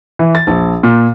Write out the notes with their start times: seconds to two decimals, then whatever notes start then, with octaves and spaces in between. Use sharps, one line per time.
0.19 E3
0.35 A6
0.47 A#1
0.83 A#2